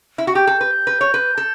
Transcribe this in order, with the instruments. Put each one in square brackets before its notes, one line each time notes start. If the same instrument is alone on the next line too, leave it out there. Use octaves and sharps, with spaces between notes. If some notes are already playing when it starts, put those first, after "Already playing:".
[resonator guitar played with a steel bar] E4
F#4
[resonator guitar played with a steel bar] G4 [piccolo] G6
[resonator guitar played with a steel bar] A4
B4
B4
C#5
B4
A4